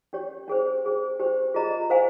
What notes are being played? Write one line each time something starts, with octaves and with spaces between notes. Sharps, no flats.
C#4 G4 C#5
C#4 G#4 C5
C#4 G#4 C5
C#4 G4 C5
F4 G#4 D#5 A#5
C5 F5 G#5